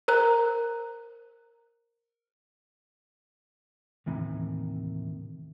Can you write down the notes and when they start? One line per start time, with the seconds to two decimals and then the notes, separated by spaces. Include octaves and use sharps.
0.08 A#4 C5 A#5 F#6
4.06 D#2 A2 C3 D#3 E3